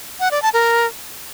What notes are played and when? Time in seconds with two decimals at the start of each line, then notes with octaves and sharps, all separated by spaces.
0.20 F#5
0.31 D5
0.42 A5
0.54 A#4